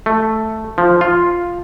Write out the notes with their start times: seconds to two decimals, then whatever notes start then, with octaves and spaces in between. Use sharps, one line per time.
0.06 A3
0.78 F3
1.01 F4